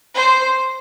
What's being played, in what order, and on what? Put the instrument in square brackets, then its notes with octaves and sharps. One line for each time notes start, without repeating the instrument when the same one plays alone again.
[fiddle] C5